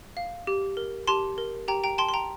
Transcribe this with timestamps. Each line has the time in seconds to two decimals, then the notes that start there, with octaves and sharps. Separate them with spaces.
0.17 F5
0.47 G4
0.77 A#4
1.07 G4 A5 C6
1.38 A#4
1.68 G4 G5 A#5
1.83 G5 A#5
1.98 G5 A5 C6
2.09 C6
2.14 G5 A#5